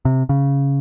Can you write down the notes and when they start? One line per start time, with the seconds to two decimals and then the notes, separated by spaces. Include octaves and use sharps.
0.05 C3
0.29 C#3